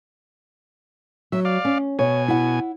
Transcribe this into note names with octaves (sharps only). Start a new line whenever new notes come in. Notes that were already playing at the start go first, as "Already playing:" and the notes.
F#3 E5
D5 F5
C#4
B2 C#5 G#5
E4 F#5